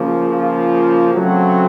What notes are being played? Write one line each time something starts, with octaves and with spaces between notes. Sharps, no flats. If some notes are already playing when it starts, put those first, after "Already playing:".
Already playing: C#3 F3 A#3
F4
C#3 F#3 A3 C4 F#4